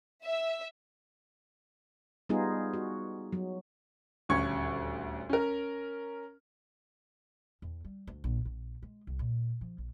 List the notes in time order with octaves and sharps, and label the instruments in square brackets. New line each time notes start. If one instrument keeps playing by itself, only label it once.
[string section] E5
[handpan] G3 B3 D#4 F4 G#4
F#4
F#3
[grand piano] D#1 D2 C#4 C#6 G#6
C#4 A#4
[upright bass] E2
G3
D2
A#1
A#1
G#3
C2
A#2
F3
A#1